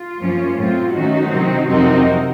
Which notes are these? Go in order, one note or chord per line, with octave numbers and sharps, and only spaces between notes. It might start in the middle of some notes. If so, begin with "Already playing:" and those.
Already playing: F4
F#2 F3 A#3 C#4
A2 F#3 C4 F4
D#3 A3 C#4 D#4 F#4
C3 D#3 F#3 C4
F2 C3 F#3 C4 D#4 F#4 A#4